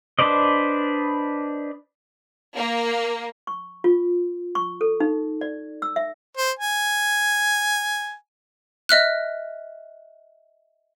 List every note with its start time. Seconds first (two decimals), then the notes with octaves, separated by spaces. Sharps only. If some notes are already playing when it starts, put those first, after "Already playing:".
0.19 D4 B4 C5 D5 D#5
2.55 A#3
3.47 C#6
3.84 F4
4.55 C#6
4.81 A4
5.00 D#4
5.41 D5
5.82 E6
5.96 E5
6.37 C5
6.59 G#5
8.89 D#5 E5 F6 F#6